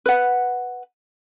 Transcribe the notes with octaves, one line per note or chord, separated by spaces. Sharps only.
B4 F#5